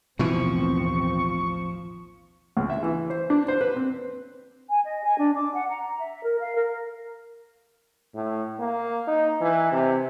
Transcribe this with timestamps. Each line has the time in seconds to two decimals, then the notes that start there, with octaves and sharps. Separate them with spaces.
0.19 A1 D#2 B2 E3 F3 C4 C#6
2.57 C#2
2.70 E5
2.83 E3
3.10 C5
3.30 D4
3.48 C5
3.61 B4
3.77 C4
4.69 G#5
4.84 D#5
5.04 G#5
5.18 D4
5.34 D6
5.54 F#5
5.69 A#5
5.98 E5
6.24 A#4
6.40 F5
6.56 A#4
8.15 A2
8.60 A#3
9.08 D#4
9.41 E3
9.72 C3